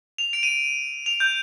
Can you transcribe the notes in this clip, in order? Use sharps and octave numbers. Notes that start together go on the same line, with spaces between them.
F7
D7
D#7
D7
F7
G6